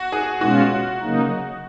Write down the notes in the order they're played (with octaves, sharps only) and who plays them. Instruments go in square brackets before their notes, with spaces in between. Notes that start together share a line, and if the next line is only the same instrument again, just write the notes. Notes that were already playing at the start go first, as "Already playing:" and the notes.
Already playing: [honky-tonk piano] F#4
G#4
[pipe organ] B2 G#3 C#4 F4 [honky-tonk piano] F#4
[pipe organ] C#3 F#3 A#3 D#4